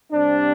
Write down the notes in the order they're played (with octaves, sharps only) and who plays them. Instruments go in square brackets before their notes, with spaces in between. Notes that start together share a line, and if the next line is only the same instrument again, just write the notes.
[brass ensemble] C3 G3 C4 D4